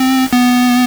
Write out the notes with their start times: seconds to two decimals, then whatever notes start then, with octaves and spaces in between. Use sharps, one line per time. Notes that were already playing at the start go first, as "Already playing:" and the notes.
Already playing: C4
0.33 B3